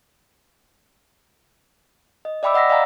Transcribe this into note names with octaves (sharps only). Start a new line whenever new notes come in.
D#5
D5 E5 G5 B5 D6 E6
D#5 F#5 E6 A#6 B6
D5 D#5 F5 G5 G#5 A#5